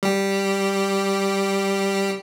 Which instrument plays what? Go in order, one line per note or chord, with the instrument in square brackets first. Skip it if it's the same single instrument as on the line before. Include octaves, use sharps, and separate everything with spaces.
[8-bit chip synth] G3 G4